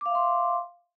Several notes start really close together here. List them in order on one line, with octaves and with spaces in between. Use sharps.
D6 F5 E5 C6